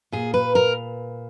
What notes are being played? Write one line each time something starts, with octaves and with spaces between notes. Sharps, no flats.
A#2 G#4
B4
A#4